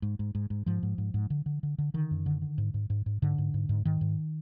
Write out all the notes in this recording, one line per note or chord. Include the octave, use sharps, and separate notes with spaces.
G#2
G#2
G#2
G#2
G#2 F3
G#2
G#2
G#2
D3
D3
D3
D3
D3 D#3
F#2
D3
D3
G#2
G#2
G#2
G#2
G#2 D3
G#2
G#2
G#2
G#2 D#3
G#2